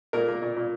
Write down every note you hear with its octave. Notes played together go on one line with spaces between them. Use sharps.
A#2 A#3 A#4
A#3
A#2
A#2